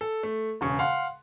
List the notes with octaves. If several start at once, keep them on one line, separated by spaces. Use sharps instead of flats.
A4
A3
E1 C#3 C#6
F5 F#5 C6